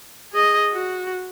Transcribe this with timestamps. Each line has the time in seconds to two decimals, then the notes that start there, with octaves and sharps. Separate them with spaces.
0.33 G#4 D#5
0.72 F#4